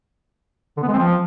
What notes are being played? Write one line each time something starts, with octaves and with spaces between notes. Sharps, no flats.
D3
B3
G#3
C4
F3